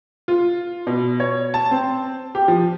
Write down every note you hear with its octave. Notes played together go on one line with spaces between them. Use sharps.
F4
B2
C#5
A5
C4
G4
F3